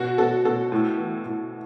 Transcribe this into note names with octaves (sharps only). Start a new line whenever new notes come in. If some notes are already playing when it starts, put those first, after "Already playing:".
Already playing: B2 F#4
B2 A4
B2 A4
A2
E3
A2